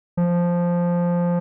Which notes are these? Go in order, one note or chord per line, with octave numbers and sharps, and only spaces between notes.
F3